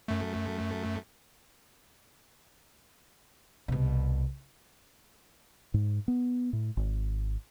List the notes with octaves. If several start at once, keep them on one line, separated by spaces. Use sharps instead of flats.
F#2 A3
C2 B2
G#2
B3
A2
G#1